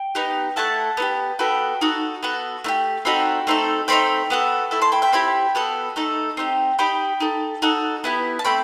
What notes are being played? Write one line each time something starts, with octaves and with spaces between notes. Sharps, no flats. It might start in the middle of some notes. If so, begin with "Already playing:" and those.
Already playing: G5
B3 D#4 G4
A3 E4 A4 F#5 A5
B3 D#4 G4
B3 F#4 A4 G5 B5
D#4 F#4 A4
B3 F#4 A4
A3 D#4 G4
C4 D#4 F#4 A4 G5 B5
A3 C4 D#4 A4
A3 C4 D#4 G5 B5
B3 F#4 A4
A3 E4 A4
A5 C6
G5 B5
E5 G5
C4 E4 G4 G5 B5
B3 F#4 A4
A3 D#4 A4
C4 D#4 G4
D#4 G4 G5 B5
D#4 A4
D#4 F#4 A4
B3 E4 G4
A5
A3 C4 G5 B5